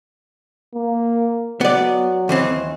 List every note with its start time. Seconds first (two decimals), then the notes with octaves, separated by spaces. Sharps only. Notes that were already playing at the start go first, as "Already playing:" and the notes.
0.75 A#3
1.61 F#3 B3 D5
2.29 D#2 E3 C4